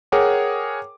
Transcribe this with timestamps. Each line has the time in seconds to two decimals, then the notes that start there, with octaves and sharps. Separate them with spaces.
0.12 G#4 A#4 C#5 F#5 G5 D6